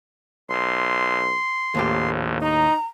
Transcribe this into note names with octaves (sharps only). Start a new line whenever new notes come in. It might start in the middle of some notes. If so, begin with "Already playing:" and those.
B1 C6
A#1 D#2 A2 G4
D#4 A#5